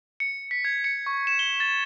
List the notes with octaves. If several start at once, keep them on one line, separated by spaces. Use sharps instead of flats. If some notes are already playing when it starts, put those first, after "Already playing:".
C#7
B6
G#6
C#7
C#6
E7
G7
A6